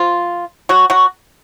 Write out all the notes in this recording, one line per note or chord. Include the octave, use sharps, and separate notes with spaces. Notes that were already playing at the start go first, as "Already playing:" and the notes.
Already playing: F3 F4
F#3 F#4
F#3 F#4